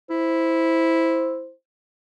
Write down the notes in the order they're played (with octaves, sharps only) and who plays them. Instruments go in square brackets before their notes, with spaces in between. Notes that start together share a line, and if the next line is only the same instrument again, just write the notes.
[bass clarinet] E4 [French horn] C5